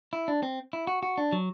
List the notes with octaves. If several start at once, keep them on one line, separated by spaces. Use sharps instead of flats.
E4
D4
C4
E4
F#4
F#4
D4
F#3